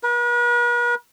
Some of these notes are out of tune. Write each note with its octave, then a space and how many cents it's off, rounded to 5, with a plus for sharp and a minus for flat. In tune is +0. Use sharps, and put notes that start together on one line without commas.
B4 -45